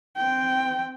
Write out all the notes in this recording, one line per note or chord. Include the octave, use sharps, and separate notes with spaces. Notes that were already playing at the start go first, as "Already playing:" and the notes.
C4 G5